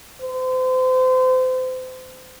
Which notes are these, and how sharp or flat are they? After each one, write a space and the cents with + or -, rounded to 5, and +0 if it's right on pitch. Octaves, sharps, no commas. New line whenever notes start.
C5 -35